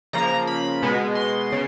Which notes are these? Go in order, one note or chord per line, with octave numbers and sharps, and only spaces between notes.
C#3 F3 A#3 A#5
B5
B2 G#3 B3
C6
C#3